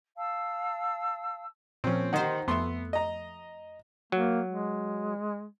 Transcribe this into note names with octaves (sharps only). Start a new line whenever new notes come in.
F5 A5 E6
A#2 F3 C4 C#4
D#3 D#4 G4 C5 F#5
F2 A3 B3 E5 C6
D#5 A#5
F#3 A#3
G#3